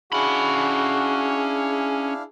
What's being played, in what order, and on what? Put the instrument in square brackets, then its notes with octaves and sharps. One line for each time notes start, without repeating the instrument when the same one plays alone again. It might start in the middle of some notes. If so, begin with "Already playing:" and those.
[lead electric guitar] C#4 B5 [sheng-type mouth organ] D4 E4 F5 [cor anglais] F#4 [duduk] G#4